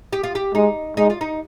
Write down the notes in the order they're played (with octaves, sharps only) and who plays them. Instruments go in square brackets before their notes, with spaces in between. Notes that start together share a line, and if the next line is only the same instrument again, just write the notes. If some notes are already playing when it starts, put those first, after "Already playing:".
[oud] G4
F4
G4
[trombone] G#3 [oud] D#4
[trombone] G#3 [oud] D#4
[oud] F4
D#4